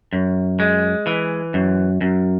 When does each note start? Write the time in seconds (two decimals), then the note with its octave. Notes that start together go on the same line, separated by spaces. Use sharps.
0.13 F#2
0.60 G#3
1.07 E3
1.54 F#2
2.01 F#2